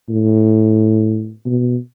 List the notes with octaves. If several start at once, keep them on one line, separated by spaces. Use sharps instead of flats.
A2
B2